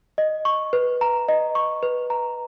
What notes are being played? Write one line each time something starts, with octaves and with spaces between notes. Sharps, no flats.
D#5
C#6
B4
A#5
D#5
C#6
B4
A#5